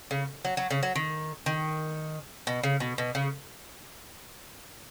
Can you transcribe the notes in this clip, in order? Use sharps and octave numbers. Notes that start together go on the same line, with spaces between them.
C#3
F#3
F#3
C#3
F#3
D#3
D#3
B2
C#3
B2
B2
C#3